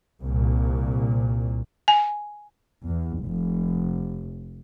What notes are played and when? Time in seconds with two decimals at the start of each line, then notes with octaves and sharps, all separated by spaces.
0.20 C2 A#2
1.88 G#5
2.87 E2
3.24 F1